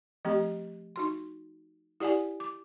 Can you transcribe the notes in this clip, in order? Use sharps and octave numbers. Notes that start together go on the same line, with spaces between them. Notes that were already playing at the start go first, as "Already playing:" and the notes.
F3 A3 C4 G4
D#4 F#4 C6
E4 G4 D5 F#5 G#5
D6